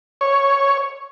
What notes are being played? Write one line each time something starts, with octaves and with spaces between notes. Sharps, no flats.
C#5